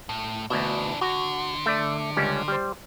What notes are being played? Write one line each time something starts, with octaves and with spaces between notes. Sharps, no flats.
A2
D2 B2 E3 D4
D3 F#4
A3 D5
C#2 G3 C#4
G3 C5